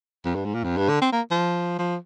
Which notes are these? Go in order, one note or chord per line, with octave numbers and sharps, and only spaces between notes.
F2
G2
G#2
A#2
F2
G2
D3
C4
A#3
F3
F3